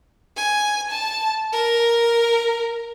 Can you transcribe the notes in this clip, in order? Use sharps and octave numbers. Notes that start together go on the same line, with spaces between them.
G#5
A5
A#4